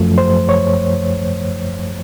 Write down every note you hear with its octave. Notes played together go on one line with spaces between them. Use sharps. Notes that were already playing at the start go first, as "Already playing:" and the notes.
Already playing: F#2 F3 A3
C5
C#5